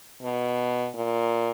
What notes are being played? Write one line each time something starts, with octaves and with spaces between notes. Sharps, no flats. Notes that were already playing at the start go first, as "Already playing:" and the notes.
B2
A#2